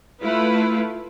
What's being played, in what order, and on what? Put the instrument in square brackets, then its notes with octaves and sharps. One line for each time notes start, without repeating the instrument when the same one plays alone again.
[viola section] A3 E4 F4 B4